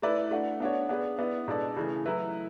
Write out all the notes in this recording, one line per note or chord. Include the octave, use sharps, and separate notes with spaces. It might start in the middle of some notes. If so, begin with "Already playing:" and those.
A3 E4 B4 D5
A3 D4 F#4
B3 D4 F#4 C#5
B3 D4 G#4 B4
B3 E4 B4 D5
B2 G#3 D4 A4 D5
C#3 E3 A3
F#3 A3 E4 B4